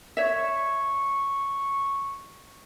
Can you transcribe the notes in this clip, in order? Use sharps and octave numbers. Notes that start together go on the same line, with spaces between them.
C#5 E5 C#6